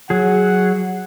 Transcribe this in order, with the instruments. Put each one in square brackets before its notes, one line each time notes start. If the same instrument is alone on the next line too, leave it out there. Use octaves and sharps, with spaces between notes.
[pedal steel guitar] F#3 G#4 [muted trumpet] F#5